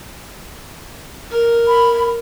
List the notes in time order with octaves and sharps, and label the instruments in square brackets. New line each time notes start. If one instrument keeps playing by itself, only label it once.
[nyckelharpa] A#4
[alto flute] B5